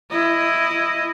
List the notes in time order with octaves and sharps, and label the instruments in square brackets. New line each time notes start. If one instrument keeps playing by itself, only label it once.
[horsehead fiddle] E4 D#5